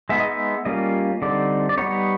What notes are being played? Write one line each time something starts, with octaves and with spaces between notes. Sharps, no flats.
G#3 B3 D#4 E5
D#5
E5
G3 A#3 C#4 F4 D#5
D3 G3 C4 D#4 D5
D5
G3 B3 D#4 C#5